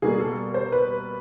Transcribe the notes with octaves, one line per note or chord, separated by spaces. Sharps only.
B2 G3 A#3 G#4
A4
C5
B4